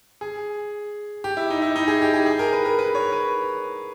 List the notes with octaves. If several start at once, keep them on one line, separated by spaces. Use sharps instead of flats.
G#4
G4
E4
D#4
E4
D#4
G#4
G4
G#4
G#4
A#4
B4
A#4
B4
C#5
B4